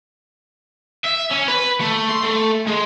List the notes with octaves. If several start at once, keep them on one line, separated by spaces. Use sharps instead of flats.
E5
C#4
B4
A3
C6
A3
G#3